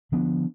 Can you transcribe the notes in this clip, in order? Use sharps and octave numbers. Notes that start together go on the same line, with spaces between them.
D3 F3 B3 D4